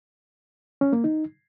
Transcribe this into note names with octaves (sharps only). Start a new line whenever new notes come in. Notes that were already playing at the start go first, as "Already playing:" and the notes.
C#4
A#3
D#4